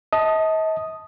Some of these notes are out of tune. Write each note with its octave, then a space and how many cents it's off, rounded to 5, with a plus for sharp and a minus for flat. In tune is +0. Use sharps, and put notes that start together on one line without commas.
D#5 +40 A5 +0 D#6 +0